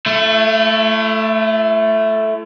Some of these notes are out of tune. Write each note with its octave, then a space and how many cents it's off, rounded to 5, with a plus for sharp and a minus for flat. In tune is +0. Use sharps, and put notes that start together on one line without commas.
A3 +0 E4 +45